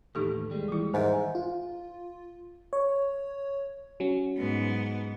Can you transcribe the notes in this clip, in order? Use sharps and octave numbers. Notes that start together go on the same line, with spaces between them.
D#2 A2 E3 D#4 G4 A4
D#2 G3 G#3
E3 E4
G#2 G#4 A#4 E5
F4
C#5
F#3 C#4
G#2 B3